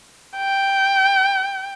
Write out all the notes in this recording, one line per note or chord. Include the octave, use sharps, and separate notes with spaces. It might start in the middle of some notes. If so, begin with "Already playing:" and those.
G5